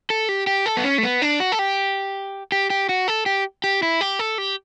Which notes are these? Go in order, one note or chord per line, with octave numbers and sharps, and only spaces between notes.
A4
G4
G4
A4
B3
C#4
A3
B3
D4
F#4
A4
G4
G4
G4
F#4
A4
G4
G4
E4
G4
A4
G4